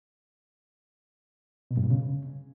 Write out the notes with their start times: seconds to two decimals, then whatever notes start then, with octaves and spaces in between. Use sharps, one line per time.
1.71 B2
1.77 G2
1.84 B2
1.90 C#3